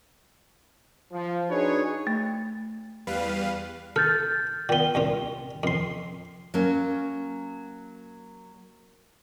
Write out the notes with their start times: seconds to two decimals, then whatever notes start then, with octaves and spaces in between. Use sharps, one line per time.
1.13 F3
1.50 D4 D#4 F#4 G#4 B4 C#5
2.07 A3
3.07 E2 G3 B4 F5
3.96 A4 F6 G6 A6
4.69 A#2 B3 G5 G7
4.95 C2 A#2 F4
5.63 F2 C6
6.54 F#3 A#3 C#4